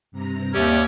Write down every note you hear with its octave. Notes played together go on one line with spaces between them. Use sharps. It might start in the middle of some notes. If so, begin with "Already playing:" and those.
G2 C3 A#5
D#2 A#3 C#4 G4 D5 E5